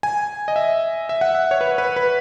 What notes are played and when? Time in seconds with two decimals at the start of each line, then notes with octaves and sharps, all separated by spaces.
0.03 G#5
0.48 D#5
0.56 E5
1.09 E5
1.21 F#5
1.35 E5
1.51 C#5
1.61 B4
1.78 B4
1.96 B4